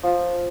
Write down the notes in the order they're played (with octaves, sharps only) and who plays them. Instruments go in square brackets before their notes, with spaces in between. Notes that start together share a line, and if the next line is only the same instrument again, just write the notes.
[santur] F3